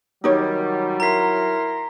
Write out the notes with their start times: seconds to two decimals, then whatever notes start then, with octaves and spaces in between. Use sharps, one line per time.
0.24 D#3 F#3 G3 D#4 G4 C#5
1.00 E4 A#4 A#5 C6 B6